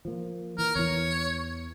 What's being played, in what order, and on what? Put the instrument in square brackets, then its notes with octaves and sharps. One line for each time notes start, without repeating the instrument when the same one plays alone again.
[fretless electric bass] F3 A#3
[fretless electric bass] E3 [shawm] A#4
[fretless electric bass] E2 E3 [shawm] C#5